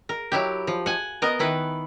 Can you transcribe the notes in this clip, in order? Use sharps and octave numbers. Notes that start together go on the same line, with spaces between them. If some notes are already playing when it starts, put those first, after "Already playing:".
A#4
F#3 E4 G4
F3
F#5 G#5
B3 A#4 D#5
D#3 E4 B4